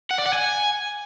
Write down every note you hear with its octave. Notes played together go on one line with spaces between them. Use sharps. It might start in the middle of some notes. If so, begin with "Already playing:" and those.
F#5
D5
F#5
G#5